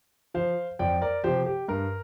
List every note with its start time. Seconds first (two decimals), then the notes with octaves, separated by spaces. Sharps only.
0.34 F3 C5 F5
0.79 F2 D5 G5
1.01 A#4 D5
1.24 C3 F3 G4 C5
1.46 G4
1.68 G2 A#4